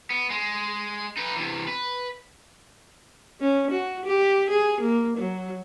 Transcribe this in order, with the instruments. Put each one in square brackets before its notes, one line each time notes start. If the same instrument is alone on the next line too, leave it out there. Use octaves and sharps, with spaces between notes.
[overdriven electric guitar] B3
G#3
D#4 B4
C3 E3
B4
[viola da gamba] C#4
F#4
G4
G#4
A#3
F#3